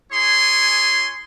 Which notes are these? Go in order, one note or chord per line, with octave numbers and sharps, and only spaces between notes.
E4 G#4 C#5 G#5 C6